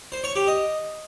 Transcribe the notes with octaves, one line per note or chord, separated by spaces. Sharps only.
C5
C#5
G4
D#5